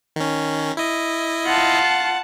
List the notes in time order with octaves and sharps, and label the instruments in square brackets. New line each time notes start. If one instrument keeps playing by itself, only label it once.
[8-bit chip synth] D#3 C#4
E4 D#5
[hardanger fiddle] F4 [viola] F#5 A5